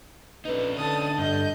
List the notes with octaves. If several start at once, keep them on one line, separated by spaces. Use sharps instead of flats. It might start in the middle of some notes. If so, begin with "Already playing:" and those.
A#1 F2 C#4 D#4 B4
D3 A5 D#6
G2 D#5 G6